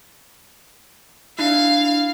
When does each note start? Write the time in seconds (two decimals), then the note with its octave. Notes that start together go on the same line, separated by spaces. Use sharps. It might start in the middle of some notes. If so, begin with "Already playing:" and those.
1.39 D4 E4 F5